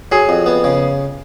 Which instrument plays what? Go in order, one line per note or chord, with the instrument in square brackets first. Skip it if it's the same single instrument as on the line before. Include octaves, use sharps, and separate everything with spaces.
[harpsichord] F#3 [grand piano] G#4
[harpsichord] F2
B3
C#3